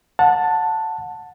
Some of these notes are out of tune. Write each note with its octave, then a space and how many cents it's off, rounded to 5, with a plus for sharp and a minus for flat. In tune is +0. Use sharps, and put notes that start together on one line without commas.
F#5 -20 A5 +5